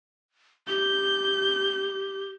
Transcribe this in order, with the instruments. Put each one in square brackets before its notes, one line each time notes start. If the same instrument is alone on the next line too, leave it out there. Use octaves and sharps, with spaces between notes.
[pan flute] G4 [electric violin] G6